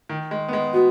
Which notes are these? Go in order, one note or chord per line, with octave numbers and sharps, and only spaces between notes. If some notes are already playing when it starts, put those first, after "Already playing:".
D#3
G#3
B3
G#3
B3 F#4